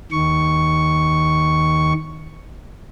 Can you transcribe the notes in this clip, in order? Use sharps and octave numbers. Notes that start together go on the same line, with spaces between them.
D#2 D#3 C#6